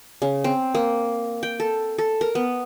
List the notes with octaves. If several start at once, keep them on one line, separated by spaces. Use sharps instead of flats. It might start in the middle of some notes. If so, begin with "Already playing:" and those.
C#3
C4
A#3
G5
A4
A4
A#4
B3